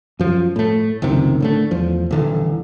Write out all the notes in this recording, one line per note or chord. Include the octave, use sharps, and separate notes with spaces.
F#2 F3
A2 A3
F#1 C#2 C3 D#3
A2 D3 A3
E2 F3
D#1 D3 E3